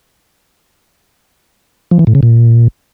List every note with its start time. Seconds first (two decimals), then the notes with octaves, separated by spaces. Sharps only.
1.91 F3
1.99 E3
2.07 A2
2.15 C#3
2.23 A#2